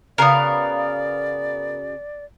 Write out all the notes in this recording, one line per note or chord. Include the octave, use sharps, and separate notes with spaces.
C#3 B3 F#4 A#4 D5 F5